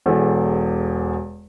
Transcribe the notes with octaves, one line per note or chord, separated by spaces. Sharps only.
E1 E2 A4